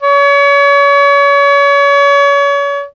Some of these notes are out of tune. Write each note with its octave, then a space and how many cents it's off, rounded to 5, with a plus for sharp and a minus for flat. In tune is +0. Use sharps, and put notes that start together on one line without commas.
C#5 +35